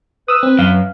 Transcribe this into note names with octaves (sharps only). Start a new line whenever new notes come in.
B4 D#6 E6
C4
F#2 F5